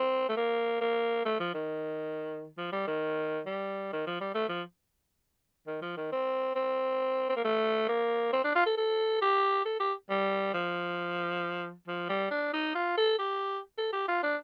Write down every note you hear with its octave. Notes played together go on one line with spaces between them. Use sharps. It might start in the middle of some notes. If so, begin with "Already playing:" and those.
Already playing: C4
A3
A#3
A#3
A3
F3
D#3
F3
G3
D#3
G3
D#3
F3
G3
A3
F3
D#3
F3
D#3
C4
C4
C4
A#3
A3
A#3
C4
D4
F4
A4
A4
G4
A4
G4
G3
F3
F3
G3
D4
D#4
F4
A4
G4
A4
G4
F4
D4